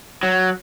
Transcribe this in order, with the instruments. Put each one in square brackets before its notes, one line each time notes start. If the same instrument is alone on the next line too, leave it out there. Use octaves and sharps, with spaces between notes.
[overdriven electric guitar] F#3